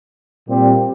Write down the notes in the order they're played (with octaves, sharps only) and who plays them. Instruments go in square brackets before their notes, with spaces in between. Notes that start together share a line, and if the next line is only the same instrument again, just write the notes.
[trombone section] A#2 G3 C4 G4